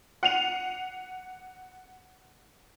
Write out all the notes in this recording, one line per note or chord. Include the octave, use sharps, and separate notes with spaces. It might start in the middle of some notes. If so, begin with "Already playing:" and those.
F#5 C7 D#7 F7